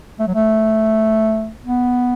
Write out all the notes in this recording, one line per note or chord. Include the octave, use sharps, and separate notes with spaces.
A3
F#3
A3
B3